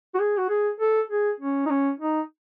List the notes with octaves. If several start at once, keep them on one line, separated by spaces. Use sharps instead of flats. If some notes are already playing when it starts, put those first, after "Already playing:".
F#4
G#4
F#4
G#4
A4
G#4
C#4
D#4
C#4
D#4